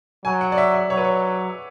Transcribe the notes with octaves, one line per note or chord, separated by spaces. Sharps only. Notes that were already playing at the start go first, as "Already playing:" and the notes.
F#3 G#5
F#5
D5
E5
E5
F#3 C#5
B4
C#5